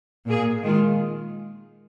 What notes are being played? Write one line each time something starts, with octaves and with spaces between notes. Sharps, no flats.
A#2 A#3 G#4
D#3 G#3 F4